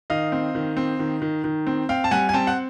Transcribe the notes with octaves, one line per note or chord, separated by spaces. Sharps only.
D#3 D#5 F5
C4
D#3
C4
D#3
D#3
D#3
C4
C4 F5 G5
A5
G3 F#5 G#5
G#5
C4 G5 A5
F#5